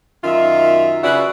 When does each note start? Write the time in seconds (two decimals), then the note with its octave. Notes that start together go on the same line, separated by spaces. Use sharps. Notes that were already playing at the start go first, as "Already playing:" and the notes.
0.24 F#2 D#3 F4 E5
1.03 C#3 F#4 B4 D5 E5